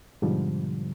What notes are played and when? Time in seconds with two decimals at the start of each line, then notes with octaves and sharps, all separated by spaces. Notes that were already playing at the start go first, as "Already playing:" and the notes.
0.22 G#2 B2 D3 F3 G3